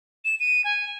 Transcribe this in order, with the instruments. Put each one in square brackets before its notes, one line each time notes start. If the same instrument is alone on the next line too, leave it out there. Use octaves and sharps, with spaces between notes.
[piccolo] E7
D#7
G#5